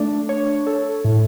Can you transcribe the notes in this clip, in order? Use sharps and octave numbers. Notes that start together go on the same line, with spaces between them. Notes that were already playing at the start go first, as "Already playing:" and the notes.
Already playing: A3 D4
C#5
A4
A2